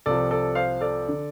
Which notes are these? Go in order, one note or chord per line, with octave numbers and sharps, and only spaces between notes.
C2 C3 F3 A4 D5
A4 D5
C5 F5
A4 D5
D3